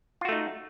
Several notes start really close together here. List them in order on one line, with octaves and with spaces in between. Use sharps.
F4 F#4 A3 D#4